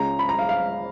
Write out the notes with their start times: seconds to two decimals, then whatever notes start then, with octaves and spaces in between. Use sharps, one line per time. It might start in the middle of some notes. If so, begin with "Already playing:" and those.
Already playing: C#2 C#3 G#3 C#4 A#5
0.19 B5
0.29 A#5
0.39 F5
0.49 F5